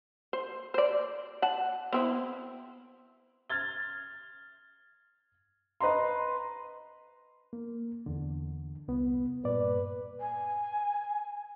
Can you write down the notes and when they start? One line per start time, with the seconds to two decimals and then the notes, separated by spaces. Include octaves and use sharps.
0.33 C5
0.74 C5 D5
1.42 F#5 A5
1.93 B3 C4 E4
3.50 F6 G#6 A6 G7
5.80 B4 D#5 A#5 C6
7.53 A#3
8.06 E2 D3
8.88 C2 B3
9.44 G2 A#2 B4 D5
10.19 G#5